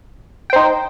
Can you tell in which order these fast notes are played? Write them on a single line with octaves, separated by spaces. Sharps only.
G5 C5 D#4